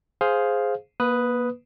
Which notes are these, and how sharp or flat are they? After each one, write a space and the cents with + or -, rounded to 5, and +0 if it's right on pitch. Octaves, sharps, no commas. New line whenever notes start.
G#4 +5 C5 +0 F5 +5
A#3 +35 B4 +0 D#6 +0